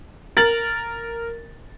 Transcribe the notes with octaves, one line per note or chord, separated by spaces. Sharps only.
A#4 A6 F#7